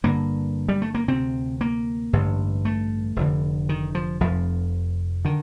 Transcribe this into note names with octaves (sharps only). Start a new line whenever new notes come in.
G1 G2 D3 A#3
G3
A3
A#3
D2 C3 C4
A#3
A1 G2 D3
A3
F1 F2 D3
D#3
F3
F1 F2 C3 F3
D3 D#3